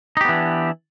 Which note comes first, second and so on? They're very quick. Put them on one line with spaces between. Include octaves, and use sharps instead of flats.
D#4 G4 B3 E3 D4